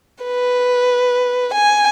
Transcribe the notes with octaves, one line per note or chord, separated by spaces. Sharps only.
B4
G#5